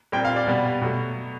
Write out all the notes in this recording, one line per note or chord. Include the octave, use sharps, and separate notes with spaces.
A#2 G3 C4 G5
F5
D5
B2 G3 B3
B2 F#3 A3